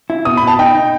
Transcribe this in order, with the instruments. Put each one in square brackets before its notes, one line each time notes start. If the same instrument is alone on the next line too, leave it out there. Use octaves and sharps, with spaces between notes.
[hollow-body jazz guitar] E4
[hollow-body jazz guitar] B2 [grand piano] D#6
[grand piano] B5
[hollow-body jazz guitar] B2
[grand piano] A5
[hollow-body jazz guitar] D#4 [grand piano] G5
[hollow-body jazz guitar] D#4